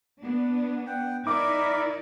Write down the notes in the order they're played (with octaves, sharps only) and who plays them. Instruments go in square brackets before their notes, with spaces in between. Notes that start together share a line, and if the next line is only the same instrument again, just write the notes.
[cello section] B3 D4
[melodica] F#5 G5
[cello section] D#4 E4 D5 [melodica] A#4 E5 B5 [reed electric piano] D6